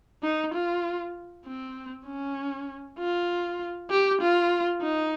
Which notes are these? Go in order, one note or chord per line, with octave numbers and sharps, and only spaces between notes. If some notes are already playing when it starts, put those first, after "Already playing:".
D#4
F4
C4
C#4
F4
G4
F4
D#4